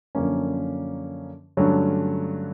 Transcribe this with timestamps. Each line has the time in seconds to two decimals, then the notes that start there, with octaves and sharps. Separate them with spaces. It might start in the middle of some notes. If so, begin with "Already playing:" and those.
0.15 F#2 D3 F3 A#3 C#4
1.57 G2 D3 F#3 A3 C#4